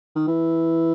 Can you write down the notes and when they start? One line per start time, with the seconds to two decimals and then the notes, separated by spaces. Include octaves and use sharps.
0.15 D#3
0.27 E3